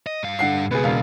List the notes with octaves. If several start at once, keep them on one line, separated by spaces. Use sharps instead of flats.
D#5
G2 F5
D3 F#5 C7
C#2 B2 G#4 B4
E1 F5